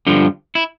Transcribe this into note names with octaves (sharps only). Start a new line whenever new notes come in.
G2 D3 F3
E4